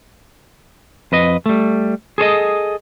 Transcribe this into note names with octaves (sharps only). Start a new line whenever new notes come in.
F2 B4 D#5
G3 A3
G#4 A4 C#5 D#5